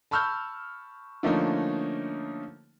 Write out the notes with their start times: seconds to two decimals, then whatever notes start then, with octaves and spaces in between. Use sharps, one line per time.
0.11 A5 B5 C#6 E6 F6 G6
1.23 D3 F3 A3 A#3 C#4 D#4